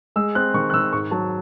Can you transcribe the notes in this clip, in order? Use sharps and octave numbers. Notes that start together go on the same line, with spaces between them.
G#3 E6
C4 F#6
D#3 C#6
F#6
D#3 E6
G#2 C#6
F#3 A5